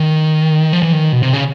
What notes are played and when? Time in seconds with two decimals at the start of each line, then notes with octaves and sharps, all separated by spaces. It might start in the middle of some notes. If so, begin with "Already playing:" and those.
Already playing: D#3
0.73 F3
0.83 E3
0.93 D#3
1.12 B2
1.23 C3
1.33 C#3